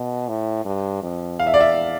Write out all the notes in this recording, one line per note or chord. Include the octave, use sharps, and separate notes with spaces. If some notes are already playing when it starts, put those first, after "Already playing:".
Already playing: B2
A2
G2
F2
E2 F5
E5
D5
E5